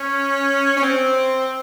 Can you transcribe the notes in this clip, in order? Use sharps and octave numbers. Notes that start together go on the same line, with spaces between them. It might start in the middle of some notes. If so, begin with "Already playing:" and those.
Already playing: C#4
C#4
C4